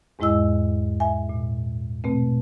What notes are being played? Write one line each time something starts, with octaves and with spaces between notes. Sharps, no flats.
E2 G#2 G#3 E4 D#5 E6
E5 G#5
A#2
B2 A3 C4